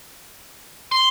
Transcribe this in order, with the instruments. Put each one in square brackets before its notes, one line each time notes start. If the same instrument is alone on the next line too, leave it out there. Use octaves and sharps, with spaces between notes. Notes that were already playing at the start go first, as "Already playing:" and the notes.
[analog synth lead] C6